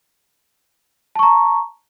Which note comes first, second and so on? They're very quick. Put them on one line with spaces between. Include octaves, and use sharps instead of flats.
A5 C#6 A#5